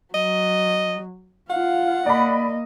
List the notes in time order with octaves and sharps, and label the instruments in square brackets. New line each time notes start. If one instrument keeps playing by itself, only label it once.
[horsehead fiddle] F#3 [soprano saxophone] D#5
[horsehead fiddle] F4 F5 [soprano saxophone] F#5
[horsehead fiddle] A#3 D#5 [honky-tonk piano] D5 B5